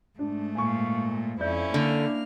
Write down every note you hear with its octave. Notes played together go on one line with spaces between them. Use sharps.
G#2 A3 D4
A#2 G#5 C#6
F2 C#4 E4 D5 E5 G6
D3 A#3 F6